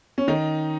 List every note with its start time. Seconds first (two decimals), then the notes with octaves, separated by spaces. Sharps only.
0.18 C#4
0.28 D#3 D#4